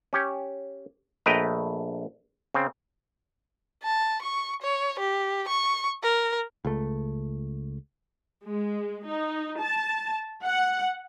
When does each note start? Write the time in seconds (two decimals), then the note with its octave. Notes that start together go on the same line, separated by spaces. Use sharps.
0.13 C#4 G4 C#5
1.26 A#1 A3 B4 D#5 G5 A#5
2.54 C#3 C4
3.84 A5
4.22 C#6
4.62 C#5
4.99 G4
5.48 C#6
6.03 A#4
6.65 C#2 A3
8.46 G#3
9.07 D#4
9.61 A5
10.44 F#5